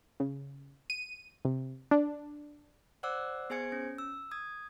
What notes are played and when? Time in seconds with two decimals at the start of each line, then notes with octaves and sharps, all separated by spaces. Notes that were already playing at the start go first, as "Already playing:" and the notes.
0.20 C#3
0.90 D#7
1.45 C3
1.91 D4
3.03 C5 D5 F#5 D6 E6 F#6
3.50 B3 G#4 C5 G#5 G#6 C#7
3.72 C#4
3.98 E6
4.31 D#6 G#6